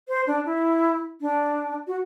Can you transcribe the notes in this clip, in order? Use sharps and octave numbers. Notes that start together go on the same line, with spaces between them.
C5
D4
E4
D4
F#4